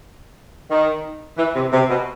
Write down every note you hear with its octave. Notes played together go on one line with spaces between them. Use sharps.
D#3
E3
C3
C3
B2